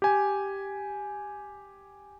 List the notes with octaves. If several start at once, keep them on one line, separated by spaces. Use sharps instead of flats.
G4 G#5